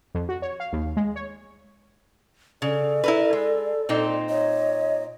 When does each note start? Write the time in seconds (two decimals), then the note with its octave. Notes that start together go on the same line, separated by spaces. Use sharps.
0.15 F2
0.29 F#4
0.42 C#5
0.60 F5
0.73 D#2
0.97 G#3
1.16 C#5
2.62 C#3 A4 D5
3.04 E4 A#4 B4
3.33 G#3
3.89 A#2 C4 D#4
4.29 C#5 D#5